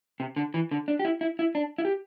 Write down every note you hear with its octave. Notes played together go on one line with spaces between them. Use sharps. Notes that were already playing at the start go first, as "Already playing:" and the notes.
C3
D3
E3
D3
D4
G4
E4
E4
E4
D4
E4
G4